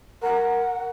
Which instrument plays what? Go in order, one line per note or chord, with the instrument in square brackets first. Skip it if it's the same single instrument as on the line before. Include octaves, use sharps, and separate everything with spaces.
[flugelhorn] A#4 [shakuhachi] F#5